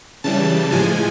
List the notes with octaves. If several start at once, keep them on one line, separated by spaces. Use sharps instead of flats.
C#3 E3 G3 A5
A2 F3 G#3 G#5